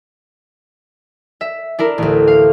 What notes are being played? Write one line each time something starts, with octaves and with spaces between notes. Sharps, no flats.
E5
D4 E4 A#4
A1 D2
F5